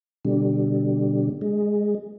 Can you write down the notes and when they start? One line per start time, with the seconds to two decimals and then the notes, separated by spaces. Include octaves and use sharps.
0.25 B2 D3 G3
1.41 G#3